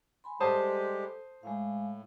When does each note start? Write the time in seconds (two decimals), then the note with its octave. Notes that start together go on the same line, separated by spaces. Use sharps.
0.24 G#5 B5 C6
0.40 G3 G#3 G4 A4 C5 A5 D#6
1.43 A2 G#3 F5